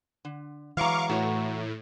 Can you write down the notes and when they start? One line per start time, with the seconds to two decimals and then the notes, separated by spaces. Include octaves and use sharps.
0.25 D3
0.77 E3 F#3 G#3 F5 A#5 C#6 D6
1.09 A2 F#4 C#5